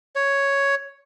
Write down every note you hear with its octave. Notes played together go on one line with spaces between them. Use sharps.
C#5